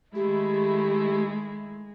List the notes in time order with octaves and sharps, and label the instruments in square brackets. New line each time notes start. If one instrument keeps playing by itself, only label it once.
[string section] D#3 A3 E4 [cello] G#3 [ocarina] G4